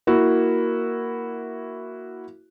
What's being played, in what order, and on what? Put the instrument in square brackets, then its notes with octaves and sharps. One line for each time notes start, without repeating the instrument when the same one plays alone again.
[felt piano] A#3 E4 F#4